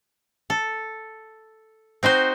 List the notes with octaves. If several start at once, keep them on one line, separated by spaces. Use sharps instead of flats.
A4
C4 D#4 F#4 C5